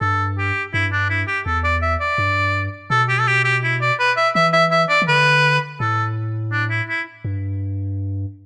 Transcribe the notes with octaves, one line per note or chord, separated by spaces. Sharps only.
G2 A4
G4
G2 E4
D4
E4
G4
E2 A4
D5
E5
D5
G2
B2 A4
G4
A4
G4
G4
E4
D5
B4
E5
E3 E5
E5
E5
D5
E3
D3 B4
A2 A4
D4
E4
E4
G2